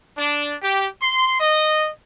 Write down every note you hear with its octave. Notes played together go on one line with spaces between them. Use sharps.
D4
G4
C6
D#5